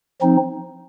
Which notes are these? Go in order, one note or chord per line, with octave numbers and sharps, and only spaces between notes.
F3 C4 D#4